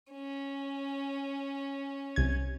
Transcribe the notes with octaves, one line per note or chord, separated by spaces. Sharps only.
C#4
C2 G#6